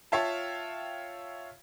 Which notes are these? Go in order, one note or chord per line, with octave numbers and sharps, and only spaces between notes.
F4 C#5 E5 F5 G5 A5